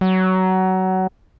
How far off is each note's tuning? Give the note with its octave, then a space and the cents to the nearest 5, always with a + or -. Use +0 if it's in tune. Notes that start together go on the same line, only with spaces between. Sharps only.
F#3 +20